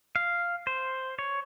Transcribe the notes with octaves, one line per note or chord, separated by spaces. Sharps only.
F5
C5
C#5